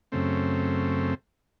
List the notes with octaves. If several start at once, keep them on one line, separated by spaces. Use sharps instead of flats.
F#2 C#3 A3 C4